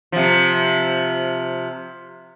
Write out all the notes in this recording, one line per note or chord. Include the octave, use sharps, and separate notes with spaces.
C3 F3